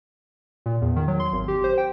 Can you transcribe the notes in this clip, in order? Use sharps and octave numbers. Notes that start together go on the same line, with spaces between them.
A#2
E2
D#3
F#3
C6
G#1
G4
C5
G5